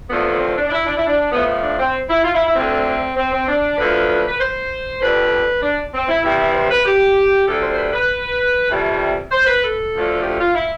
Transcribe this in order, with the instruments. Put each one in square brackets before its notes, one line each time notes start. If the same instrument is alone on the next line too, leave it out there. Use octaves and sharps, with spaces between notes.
[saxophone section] E2 D3 F3 A3 B3
B3
C4
D4
D4
E4
D4
E4
D4
A2 F3 A3 B3
B3
D4
C4
E4
F4
E4
E4
D2 D3 A3 C4
C4
C4
D4
D2 D3 F3 A3 B4
B4
C5
F2 D3 G3 B4
D4
C4
E4
E2 C3 E3 G3 E4
E4
C5
B4
G4
D2 D3 G3 A4
C5
C5
B4
B4
F2 C3 E3 G3
C5
B4
A4
D2 D3 F3 A3
G4
F4
E4